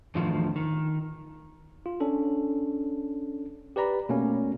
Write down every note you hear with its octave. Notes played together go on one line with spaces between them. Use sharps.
E2 A2 D3 D#3 F3
D#3
F4
C#4 D4 A4
G4 B4 D5 A#5 B5
B2 A3 A#3 C#4